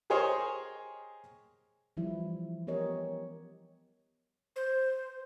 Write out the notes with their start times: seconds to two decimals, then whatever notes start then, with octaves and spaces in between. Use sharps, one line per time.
0.10 G4 G#4 A#4 C5 C#5 D#5
1.97 E3 F3 G3 E4
2.67 B3 G4 A#4 C#5 D#5
4.56 C5